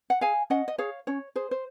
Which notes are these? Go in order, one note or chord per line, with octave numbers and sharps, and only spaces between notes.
F#5
G#4 F5 G#5
C#4 D#5 F#5
D#5
G#4 C#5 F5
C#4 C#5
G#4 C5
C5